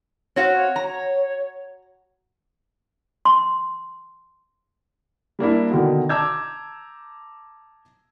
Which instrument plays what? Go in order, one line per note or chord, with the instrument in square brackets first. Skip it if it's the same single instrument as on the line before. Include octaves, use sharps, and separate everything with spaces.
[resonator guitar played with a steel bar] C4 F#4 F5 [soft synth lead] C#5
[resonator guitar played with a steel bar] A#5
[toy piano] C6
[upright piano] G3 A#3 D4 E4
B2 D3 D#3
A5 A#5 D6 E6 G6 G#6